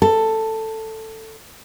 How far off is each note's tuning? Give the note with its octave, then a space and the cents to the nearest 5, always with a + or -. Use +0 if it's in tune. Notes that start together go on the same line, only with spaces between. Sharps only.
A4 +10